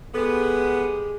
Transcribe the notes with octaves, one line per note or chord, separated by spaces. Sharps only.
G#3 B3 G4 A4